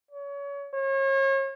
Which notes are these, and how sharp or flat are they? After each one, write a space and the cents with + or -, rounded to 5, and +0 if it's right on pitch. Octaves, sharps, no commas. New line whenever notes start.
C#5 +30
C#5 -35